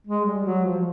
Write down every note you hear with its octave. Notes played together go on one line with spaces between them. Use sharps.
G#3
G3
F#3
F3